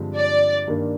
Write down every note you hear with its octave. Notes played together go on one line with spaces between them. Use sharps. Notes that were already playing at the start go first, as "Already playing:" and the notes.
Already playing: G2 D3 F3 G#3 C4
D5
G2 D#3 A#3 D4